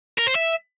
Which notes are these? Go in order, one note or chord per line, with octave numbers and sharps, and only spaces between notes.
A#4
C5
E5